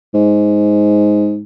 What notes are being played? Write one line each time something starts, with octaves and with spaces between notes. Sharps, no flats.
G#2